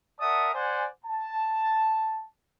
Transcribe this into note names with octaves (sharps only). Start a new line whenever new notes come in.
A#4 D5 E5 F#5 A5 D#6
C5 D5 F#5 G#5
A5